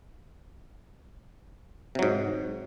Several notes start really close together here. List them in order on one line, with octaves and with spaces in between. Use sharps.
C3 F#3 G#2